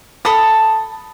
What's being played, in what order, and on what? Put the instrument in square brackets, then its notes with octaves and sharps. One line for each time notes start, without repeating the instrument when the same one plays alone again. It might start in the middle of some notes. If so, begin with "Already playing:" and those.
[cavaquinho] A4 A5 B5 D#6